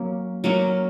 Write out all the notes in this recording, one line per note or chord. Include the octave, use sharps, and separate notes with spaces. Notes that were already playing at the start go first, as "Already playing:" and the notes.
Already playing: F#3 A#3 C#4
F#3 A#3 C#4